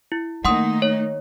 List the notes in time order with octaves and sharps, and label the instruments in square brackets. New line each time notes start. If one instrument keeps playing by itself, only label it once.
[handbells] E4
[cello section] D#3 A#3 D#4 [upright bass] A3 [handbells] F#5 C6 D#6
[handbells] C#5